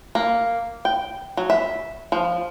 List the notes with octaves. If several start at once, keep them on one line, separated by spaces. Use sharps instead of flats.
A#3
G5
F#3
E5
F3